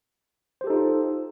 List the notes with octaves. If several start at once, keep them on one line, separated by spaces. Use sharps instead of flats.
D#4 F4 G4 A4 C5